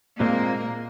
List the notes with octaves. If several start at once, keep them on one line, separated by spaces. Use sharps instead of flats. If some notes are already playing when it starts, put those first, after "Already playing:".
A#2 G#3 A#3 C4